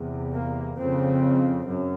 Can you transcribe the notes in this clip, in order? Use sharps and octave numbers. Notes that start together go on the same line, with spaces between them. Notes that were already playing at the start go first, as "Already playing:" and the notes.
Already playing: E2 C3
A#3
F2 C#3 C4
F#2